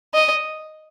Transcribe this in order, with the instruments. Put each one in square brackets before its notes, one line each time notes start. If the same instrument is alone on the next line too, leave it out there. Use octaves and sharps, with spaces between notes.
[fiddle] D#5